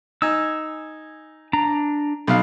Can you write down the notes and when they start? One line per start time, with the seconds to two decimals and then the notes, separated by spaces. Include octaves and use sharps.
0.22 D#4 G#5 E6
1.53 D4 A#5
2.27 B1 F5